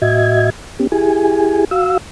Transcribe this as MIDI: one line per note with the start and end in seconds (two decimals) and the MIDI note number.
0.02 0.50 45
0.02 0.50 66
0.02 0.50 75
0.02 0.50 76
0.02 0.50 92
0.79 0.87 59
0.79 0.87 61
0.79 0.87 67
0.92 1.65 64
0.92 1.65 67
0.92 1.65 68
0.92 1.65 80
1.71 1.97 66
1.71 1.97 77
1.71 1.97 88